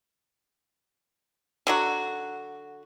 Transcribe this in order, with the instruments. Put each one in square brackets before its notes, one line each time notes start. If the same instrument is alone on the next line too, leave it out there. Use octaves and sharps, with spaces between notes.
[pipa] D3 F#3 F#4